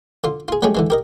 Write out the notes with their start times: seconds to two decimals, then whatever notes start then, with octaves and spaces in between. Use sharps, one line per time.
0.24 D3 F4
0.48 F4 G#4
0.62 F#3 G#3 A3 C#4 G4 G#4
0.75 D3 E3 G#3
0.90 G4 A#4 D#5